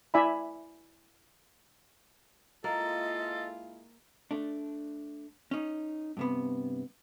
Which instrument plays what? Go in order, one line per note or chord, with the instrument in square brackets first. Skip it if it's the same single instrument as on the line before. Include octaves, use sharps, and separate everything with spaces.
[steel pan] E4 D5 E5 G#5 B5
[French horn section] G#3 E4 F4 [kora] A#3 [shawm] A4 [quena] D#5
[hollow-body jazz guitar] A3 D4
C#4 D#4
G2 C3 B3